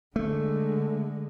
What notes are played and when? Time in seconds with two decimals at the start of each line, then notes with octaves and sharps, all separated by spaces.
0.16 D3 G#3 A3